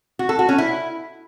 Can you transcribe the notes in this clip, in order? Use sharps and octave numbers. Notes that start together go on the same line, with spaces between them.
F#4
A4
F#4
C#4
E4